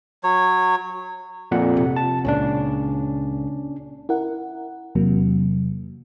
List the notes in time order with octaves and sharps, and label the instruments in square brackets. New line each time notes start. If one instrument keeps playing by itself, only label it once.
[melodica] F#3 C#5
[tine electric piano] F2 A#2 F#5
[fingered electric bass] C3
[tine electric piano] A5
[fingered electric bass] C#2 A#2 C#3 [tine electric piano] C#4 D4
[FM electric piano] E4 A#4 F#5
E2 C3 F#3 A#3